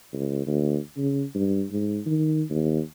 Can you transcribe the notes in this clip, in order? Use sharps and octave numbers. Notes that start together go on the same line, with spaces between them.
C#2
D2
C#3
G2
G#2
D#3
D#2